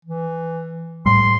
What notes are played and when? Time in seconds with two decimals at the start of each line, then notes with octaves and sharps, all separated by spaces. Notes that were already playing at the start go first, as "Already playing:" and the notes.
0.05 E3
1.06 A2 G3 C6